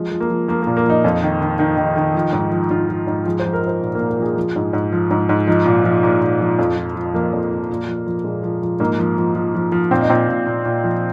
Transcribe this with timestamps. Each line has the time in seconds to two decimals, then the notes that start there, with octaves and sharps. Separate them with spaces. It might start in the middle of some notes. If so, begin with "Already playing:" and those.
Already playing: F3 G#3
0.12 F3
0.20 A#3
0.29 F3
0.48 F3 A#3
0.62 A#2 A#3
0.77 A#3
0.86 F3 D#4
1.04 F2
1.23 D#3
1.41 D#3
1.59 D#3 D#4
1.77 D#3
1.96 D#3
2.14 F3
2.33 G#2
2.52 F3
2.71 G#2 F4
2.89 F3
3.07 G#2
3.26 F3 G#4
3.40 F3 C5
3.53 A#4
3.62 F3
3.67 C5
3.81 A#2
3.95 A#2 A#3
4.09 A#4
4.18 F3 G#4
4.36 F3
4.56 G#2
4.73 G#2
4.92 F3
5.11 G#2
5.29 G#2
5.47 F3 D#4
5.65 A#2
5.84 F3
6.03 A#2
6.21 A#2
6.40 F3
6.59 F2
6.77 F3
6.95 F3
7.14 F3 A#3
7.33 F2
7.50 F3
7.70 A#2
7.87 F3
8.06 F3
8.24 A#2 G#3
8.43 F3
8.62 F3
8.80 G#2 A#3
8.99 F3
9.18 F3
9.35 F3
9.55 F3
9.72 F3
9.91 A#2 C4
10.01 D#4
10.09 A#2 C4
10.28 A#2
10.46 A#2
10.65 A#2
10.84 F3